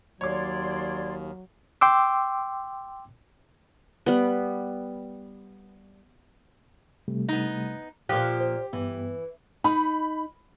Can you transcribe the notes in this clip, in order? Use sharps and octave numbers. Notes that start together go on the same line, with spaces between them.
D#2 F#3 C#5 D5 C6 D6 G#6
G5 C6 D6 E6
G3 B3
C3 G3 A3
B3 D#4
A#2 F3 G4 F#6
C5
G2 E3 B3
D#4 B5